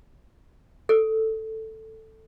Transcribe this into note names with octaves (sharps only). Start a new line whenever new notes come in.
A4